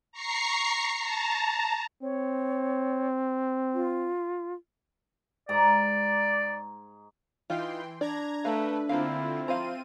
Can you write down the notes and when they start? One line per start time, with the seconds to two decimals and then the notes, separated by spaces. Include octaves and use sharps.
0.12 A#5 C#6 C7
0.99 A5 A#5
2.03 C4 C#5
3.74 F4
5.49 G#2 D5 A#5
7.50 E3 D#4 F4 G5 C6
8.01 D4 D5 A#5 G#6
8.45 A3 B4 F5 A#5
8.89 D3 A#3 C4 E4 F4 F5
9.48 F3 C4 F4 C5 F5 A#5 D#7